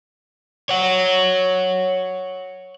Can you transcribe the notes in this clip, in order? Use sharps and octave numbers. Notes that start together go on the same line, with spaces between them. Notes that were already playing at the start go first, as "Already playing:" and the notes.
C#5 F#5